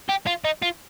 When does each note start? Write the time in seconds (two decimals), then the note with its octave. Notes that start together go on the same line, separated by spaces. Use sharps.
0.09 G4
0.27 F4
0.45 D#4
0.63 F4